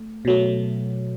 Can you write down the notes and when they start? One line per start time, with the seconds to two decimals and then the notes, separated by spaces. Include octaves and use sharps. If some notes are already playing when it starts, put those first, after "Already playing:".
Already playing: A3
0.25 B2 F#3 A3